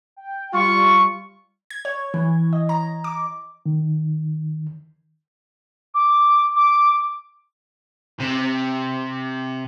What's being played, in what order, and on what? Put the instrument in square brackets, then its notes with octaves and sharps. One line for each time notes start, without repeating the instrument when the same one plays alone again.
[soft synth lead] G5
[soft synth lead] G3 [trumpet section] F4 C#6
[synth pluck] G#6
C#5
E3
D#5
A#5
D6
[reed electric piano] D#3
[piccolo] D6
D6
[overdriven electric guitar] C3